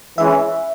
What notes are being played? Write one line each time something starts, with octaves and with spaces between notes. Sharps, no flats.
E3 G#3 C#4 E4 E5